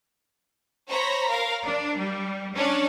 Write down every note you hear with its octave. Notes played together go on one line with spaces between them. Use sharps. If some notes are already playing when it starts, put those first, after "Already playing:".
C5 C#5 A#5 B5
A#4 F5
D4
G3
C#4 D4 C#5